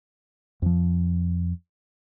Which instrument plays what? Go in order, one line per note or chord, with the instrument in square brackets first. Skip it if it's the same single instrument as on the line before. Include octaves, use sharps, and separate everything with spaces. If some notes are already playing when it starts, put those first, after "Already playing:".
[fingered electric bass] F2 F3